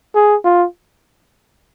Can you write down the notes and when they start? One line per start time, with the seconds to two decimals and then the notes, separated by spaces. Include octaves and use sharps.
0.15 G#4
0.45 F4